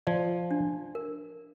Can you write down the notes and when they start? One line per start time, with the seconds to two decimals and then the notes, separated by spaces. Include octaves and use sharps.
0.07 F3 D5
0.51 D4
0.95 A#4